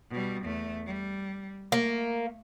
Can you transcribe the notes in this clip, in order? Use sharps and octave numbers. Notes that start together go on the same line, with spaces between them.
B2 G3
E2 A3
G3
A3 A#3